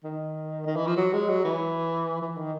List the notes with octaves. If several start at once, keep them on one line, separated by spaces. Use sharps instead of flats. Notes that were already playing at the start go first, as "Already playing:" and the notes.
D#3
D#3
E3
F3
F#3
G#3
F#3
E3
E3
D#3